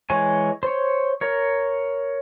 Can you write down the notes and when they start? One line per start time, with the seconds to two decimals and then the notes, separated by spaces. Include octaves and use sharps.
0.10 E3 G#3 C#5 G#5
0.63 C5 C#5
1.21 A#4 C#5